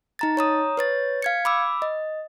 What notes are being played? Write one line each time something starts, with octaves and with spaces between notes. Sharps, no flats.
D#4 A#5 A6
C#5 A#5 D#6
B4 C#5 A6
F5 G#6 C#7
B5 D6 E6
D#5